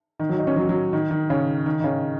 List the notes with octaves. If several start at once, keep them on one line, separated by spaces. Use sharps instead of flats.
D#3
F#3
D#4
C#4
F#3
F#3
D#3
D#3
C#3
D#3
D#3
C#3